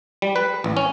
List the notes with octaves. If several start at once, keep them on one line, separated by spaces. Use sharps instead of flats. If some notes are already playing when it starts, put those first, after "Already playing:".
G3
B4
A1
C#4